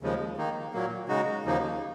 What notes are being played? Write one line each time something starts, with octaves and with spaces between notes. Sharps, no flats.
D#2 C#3 F3 G#3
D#3 A#3 D#4
A#2 F#3 A#3
C#3 G#3 D#4 F#4
D#2 C#3 F3 A#3 D#4